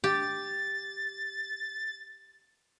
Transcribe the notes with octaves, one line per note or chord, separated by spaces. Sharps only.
G4 A6